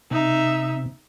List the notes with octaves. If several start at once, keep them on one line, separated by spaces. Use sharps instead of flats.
C3 D#4 E5